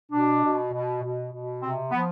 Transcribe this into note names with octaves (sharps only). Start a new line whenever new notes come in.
B2 D4
B2
B2
B2
B2
C3 C4
F3 B3